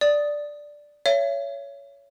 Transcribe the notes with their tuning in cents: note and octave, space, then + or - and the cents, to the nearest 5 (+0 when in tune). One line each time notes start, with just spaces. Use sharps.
D5 +0 D#6 +0
C#5 +20 E5 +35